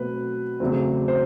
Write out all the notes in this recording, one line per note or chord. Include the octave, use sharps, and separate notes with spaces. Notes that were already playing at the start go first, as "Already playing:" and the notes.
Already playing: B2 F#3 A3 C4 B4
E2 C#3 F#3 A3 C4
C5